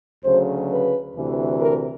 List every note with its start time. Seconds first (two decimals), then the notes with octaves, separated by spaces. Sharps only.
0.24 D2 C#3 F#3 C5
0.70 B4
1.15 D2 C3 E3
1.60 A#4